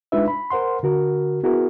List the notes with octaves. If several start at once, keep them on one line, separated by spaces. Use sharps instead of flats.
G#3 D4 D#4 F4 B4 E5
B5
A#4 C5 F#5 C6
D3 F#4 A#4
B3 E4 F#4 G#4 A#4